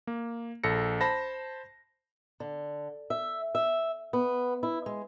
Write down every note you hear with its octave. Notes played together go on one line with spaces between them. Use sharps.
A#3
A#1 A4 A#6 C#7
C5 A5 B5 A#6
D3
E5
E5
B3
E4
G#3